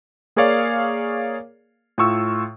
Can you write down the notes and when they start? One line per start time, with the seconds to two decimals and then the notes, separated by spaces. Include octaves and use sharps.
0.36 A#3 G#4 A#4 C#5 D5 F5
1.98 A2 F4 C#6 E6